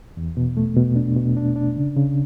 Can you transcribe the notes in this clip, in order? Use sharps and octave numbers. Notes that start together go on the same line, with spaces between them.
E2
B2
A3
B2
D4
B2
D4
D4
C#3
C#3